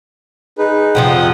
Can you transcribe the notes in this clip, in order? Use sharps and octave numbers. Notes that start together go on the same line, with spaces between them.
D#4 G#4 B4
F2 C3 F3 F#5 G5 D#6